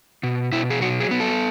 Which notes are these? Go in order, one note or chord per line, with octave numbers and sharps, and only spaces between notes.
B2
B2 E4
G#4
F#3 F#4
G#4
B3
A4